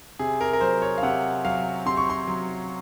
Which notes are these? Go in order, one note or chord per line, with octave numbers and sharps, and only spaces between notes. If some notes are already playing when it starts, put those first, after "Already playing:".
C3 G#4
A#4
A#4
F#3 C5
C#5
F5
C3 F#5
F#3 F5
C3 C6
C#6
C6
F#3